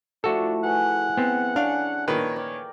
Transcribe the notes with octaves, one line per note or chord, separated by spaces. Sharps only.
F3 A3 D4 E4 F#4 A4
G#4 B4 F#5
B3 C4
C#4 D4 F5
A#2 D#3 A#4 B4 C#5 A5 A#5
C#5 D5 G5